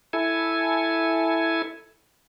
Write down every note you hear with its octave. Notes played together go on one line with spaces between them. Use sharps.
E4 A4 G#5